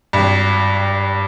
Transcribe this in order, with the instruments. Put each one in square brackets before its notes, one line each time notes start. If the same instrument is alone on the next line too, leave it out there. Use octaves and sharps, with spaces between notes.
[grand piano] G#1 G2